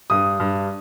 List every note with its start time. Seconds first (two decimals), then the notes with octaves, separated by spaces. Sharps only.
0.10 G2 D#6
0.40 G2